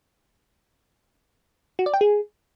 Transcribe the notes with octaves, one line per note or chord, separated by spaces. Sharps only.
F#4
D5
G5
G#4